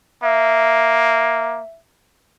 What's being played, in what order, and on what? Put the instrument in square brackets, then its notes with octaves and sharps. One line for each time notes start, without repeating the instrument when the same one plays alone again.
[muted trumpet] A#3 [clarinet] E5